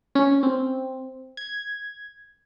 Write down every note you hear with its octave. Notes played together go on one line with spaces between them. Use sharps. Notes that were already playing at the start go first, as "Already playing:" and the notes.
C#4
C4
G#6